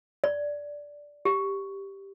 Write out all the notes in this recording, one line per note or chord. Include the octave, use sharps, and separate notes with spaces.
D5
G4